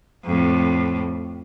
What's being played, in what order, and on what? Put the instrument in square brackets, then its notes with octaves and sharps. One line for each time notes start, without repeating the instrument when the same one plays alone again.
[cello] F2 A2